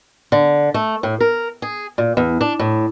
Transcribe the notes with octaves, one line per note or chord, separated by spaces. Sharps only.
D3
A3
A2
A#4
G#4
A#2
E2
D4
A2